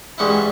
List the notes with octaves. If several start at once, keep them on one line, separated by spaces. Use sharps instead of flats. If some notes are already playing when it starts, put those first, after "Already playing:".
G2 E3 G#3 C#4 E4 F#5